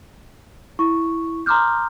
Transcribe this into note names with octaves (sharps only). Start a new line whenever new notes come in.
E4 C#6
A#5 C6 D6 D#6 F6 G6